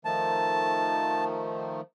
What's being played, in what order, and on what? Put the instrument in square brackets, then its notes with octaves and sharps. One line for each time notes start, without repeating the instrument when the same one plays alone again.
[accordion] D#3 F3 A3 [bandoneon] A5